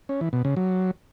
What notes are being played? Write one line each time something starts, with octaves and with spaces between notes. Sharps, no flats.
C#4
E3
B2
C#3
F#3